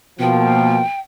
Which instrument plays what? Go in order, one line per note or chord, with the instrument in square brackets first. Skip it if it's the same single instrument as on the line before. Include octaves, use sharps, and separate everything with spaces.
[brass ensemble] B2 F3 A#3 [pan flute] G5